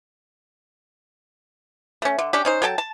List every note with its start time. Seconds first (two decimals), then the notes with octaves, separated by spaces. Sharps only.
2.02 A3 C#4
2.19 D3
2.33 C#4 D4 G4
2.45 C#4 D#4 C5
2.62 F#3 A4 G5 A5
2.78 A5